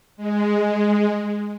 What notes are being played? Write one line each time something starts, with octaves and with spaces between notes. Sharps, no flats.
G#3